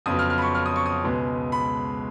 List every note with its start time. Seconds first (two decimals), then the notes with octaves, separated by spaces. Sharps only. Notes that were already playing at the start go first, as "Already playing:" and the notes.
0.06 F2 C#3 F#3 B3 D#6
0.19 F6
0.30 F6
0.38 B5
0.42 C#6
0.55 F6
0.66 D#6
0.76 C#6
0.86 D#6
1.04 C#2 B2 G#3 B3
1.52 B5